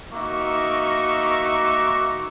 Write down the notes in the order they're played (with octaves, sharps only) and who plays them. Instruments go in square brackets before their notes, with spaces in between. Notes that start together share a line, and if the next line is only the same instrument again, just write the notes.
[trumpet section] A#3 D#4 F#4 E5 C#6 D6